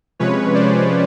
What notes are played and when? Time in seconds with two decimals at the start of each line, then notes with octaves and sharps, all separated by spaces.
0.19 C3 F3 G#3 C#4 B4 C#5
0.55 C5 D5